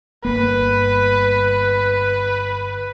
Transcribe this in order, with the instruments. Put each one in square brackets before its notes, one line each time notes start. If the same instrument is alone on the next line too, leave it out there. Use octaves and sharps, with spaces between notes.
[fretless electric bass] G1 A#3 [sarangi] B4